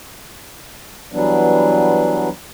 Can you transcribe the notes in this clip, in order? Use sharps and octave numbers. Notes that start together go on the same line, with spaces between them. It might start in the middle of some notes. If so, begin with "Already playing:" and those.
E3 F#3 G3 B3 D4